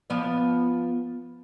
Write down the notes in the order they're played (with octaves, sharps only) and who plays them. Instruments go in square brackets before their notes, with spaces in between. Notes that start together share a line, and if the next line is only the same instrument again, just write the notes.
[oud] F3 B3 D5